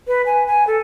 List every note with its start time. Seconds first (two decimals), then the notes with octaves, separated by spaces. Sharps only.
0.07 B4
0.26 G#5
0.47 G#5
0.67 A4